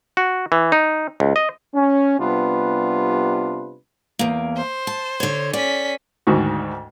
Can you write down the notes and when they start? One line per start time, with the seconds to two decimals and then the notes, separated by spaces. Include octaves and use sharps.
0.17 F#4
0.52 E3
0.72 D#4
1.20 C#2
1.36 D#5
1.74 C#4
2.20 C3 G3 B3 D4 F4 B4
4.19 E2 A#3
4.57 C5
4.87 A5
5.20 D3 C#5
5.53 C#4 D5 B6
6.27 D2 G#2 D#3 F#4